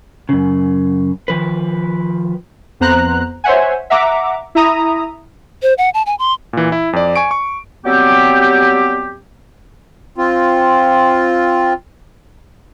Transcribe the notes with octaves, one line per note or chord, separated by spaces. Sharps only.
F#2 C#3
D#3 F3 B4
F2 B3 C5 A#5 F#6
C5 C#5 E5 F#5 G#5
E5 F#5 A#5 D6
E4 E5 A#5 D#6
C5
F#5
A5
G#5
C6
A#2 E3
E4
F2 D5
G#5 C#6 D7
C#6
F#3 G3 B3 C4 G4
C4 F4